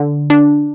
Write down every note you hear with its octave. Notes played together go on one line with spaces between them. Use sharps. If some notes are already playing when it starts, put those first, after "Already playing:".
Already playing: D3
D4